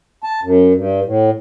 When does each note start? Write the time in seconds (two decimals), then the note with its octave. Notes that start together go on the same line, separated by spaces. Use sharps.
0.24 A5
0.43 F#2
0.74 G2
1.04 A2